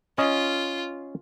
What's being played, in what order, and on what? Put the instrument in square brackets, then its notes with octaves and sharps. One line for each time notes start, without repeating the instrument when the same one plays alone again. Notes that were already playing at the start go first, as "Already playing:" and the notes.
[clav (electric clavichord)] C#4 D#5 [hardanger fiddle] F4